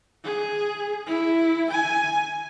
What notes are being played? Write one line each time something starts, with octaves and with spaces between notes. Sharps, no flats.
G#4
E4
G#5